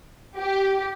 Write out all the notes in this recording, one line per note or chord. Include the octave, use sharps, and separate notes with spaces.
G4